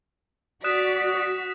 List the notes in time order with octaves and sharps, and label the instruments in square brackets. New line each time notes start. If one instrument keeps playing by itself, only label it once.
[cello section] F#4 [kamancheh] D5 [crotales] D#6 F#6 E7 [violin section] B6